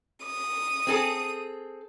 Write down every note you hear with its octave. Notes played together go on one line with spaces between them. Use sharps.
D#6
C4 G#4 A4